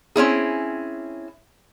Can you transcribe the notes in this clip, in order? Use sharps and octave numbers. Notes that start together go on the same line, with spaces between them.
C4 C#4 E4 G#4